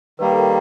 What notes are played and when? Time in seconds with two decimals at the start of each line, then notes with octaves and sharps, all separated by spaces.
0.19 D#3 G3 A#3 B4
0.32 A4
0.39 A#4